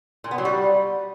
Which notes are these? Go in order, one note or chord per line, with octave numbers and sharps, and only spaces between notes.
A#2
B3
F#3
G3